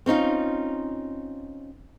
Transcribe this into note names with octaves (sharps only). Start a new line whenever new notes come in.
C4 C#4 D#4 F4